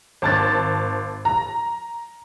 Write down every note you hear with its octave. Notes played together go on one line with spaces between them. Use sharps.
G#1 A5 A6
A#5